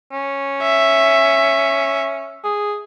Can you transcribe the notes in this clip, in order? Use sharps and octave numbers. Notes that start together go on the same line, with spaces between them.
C#4
E5
G#4